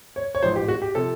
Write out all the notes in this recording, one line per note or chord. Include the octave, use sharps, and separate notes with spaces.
C#5
C#5
A1 G#2 F3 C5
G4
F#4
G4
C3 F3 A4